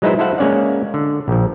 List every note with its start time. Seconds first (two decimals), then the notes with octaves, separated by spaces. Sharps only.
0.02 F#3 G#3 D#4 E4 B4 C5
0.19 E4 A4 C5 F5 F#5
0.38 G#3 A#3 C#4 D5 F#5
0.94 D3
1.28 A#1 F3